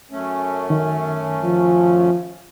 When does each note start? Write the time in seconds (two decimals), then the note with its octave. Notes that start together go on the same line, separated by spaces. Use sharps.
0.11 F#2 A3 C#4
0.70 D#3
1.44 F3